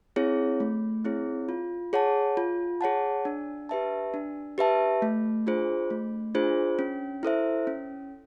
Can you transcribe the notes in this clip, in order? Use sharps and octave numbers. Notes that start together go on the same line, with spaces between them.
C4 E4 G#4 C#5
A3
C4 E4 G#4 C#5
F4
G#4 C#5 F#5 A5
F4
G#4 C#5 F#5 A5
D4
G4 B4 E5 A5
D4
G4 B4 E5 A5
A3
D4 F4 G#4 C5
A3
D4 F4 G#4 C5
C#4
E4 A4 C5 E5
C#4